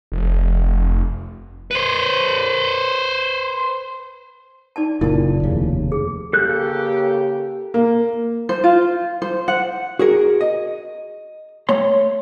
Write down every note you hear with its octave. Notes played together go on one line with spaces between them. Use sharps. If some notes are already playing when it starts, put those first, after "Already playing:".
F1
B4 C5
D#4 D5 A5
F#1 A#2 E4 A5
F1 D#2 C#3
G#4
C#3 A#3 G4 A4 F#6 G6
A#3
C5
F4
C5
F#5
F#4 G#4 A#4
D#5
A3 C#5 C6